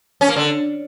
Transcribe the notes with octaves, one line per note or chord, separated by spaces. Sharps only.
C#4
A#3
D3